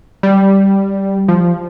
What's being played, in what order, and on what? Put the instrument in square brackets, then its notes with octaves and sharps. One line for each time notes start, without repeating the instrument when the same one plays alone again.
[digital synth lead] G3
F3